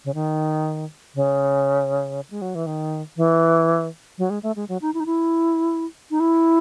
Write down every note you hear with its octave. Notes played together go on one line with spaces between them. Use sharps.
C#3
D#3
C#3
G#3
F#3
E3
D#3
E3
F#3
G#3
A3
G#3
F#3
D#4
E4
D#4
E4
D#4
E4